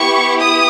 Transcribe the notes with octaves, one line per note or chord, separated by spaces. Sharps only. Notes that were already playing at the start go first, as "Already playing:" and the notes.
Already playing: B3 E4 G4 C#6
D#6